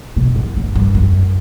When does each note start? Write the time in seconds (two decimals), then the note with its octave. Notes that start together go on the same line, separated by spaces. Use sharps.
0.16 B2
0.36 F#2
0.56 F#2
0.75 G2
0.95 F#2